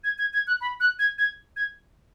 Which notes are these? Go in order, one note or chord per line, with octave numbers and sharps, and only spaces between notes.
G#6
G#6
G#6
F#6
B5
F#6
G#6
G#6
G#6